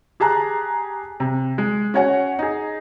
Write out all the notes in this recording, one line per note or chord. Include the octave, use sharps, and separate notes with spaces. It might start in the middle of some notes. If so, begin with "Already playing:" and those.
G4 G#4 A5 A#5 F#6
C3
G#3
C#4 F#4 C#5 F#5 G#5
D#4 G#4